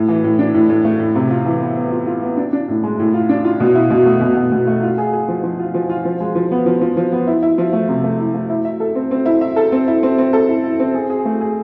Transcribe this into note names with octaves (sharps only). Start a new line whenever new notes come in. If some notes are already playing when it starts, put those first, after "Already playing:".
Already playing: A2
E3
A2
D4
A2
A2
A3
A2
C3
F4
E3
B3
B3
F4
F4
B3
D4
D4
A2
G#3
A2
F4
D4
F4
B2
E4
B2
A3
B2
B2
B2
A3
F4
G#4
G#4
F3
F3
F4
F3
F4
F3
G#3
F3
B3
F3
F3
F3
B3
E4
E4
F3
A3
C3
A3
E4
A3
E4
E5
A4
C4
C4
E4
E5
A4
C4
E4
C4
C4
A4
E4
E4
C4
G#4
G#4
A3
G#4